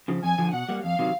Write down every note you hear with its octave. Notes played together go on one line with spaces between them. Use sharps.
C#3 F3
F2 G#5
D3 F3
B2 F#5
G3 A#3
F2 F5
C3 D#3 F#3